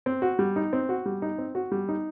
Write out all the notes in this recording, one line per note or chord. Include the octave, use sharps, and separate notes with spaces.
C4
F#4
G3
D#4
C4
F#4
G3
D#4
C4
F#4
G3
D#4